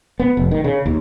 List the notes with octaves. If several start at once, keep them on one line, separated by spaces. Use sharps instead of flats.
B3
F1
D#3
C#3
D#2